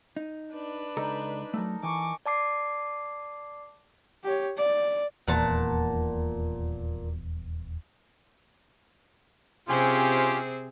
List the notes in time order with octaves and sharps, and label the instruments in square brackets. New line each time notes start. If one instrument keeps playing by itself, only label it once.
[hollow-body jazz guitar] D#4
[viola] D4 B4
[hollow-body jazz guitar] C#2 A4 A#5 [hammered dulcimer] D#4 D5
[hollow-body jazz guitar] F#3 A3 [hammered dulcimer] A4 A#4
[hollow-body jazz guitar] E3 [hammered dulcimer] G#5 [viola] C#6 D6
[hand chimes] D5 A5 D6 C7
[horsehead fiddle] G4 C#5
D5
[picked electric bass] D#1 E2 [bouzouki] A#2 F#5 A5
[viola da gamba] C3 C4 G#4 [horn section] C#4 F4 G4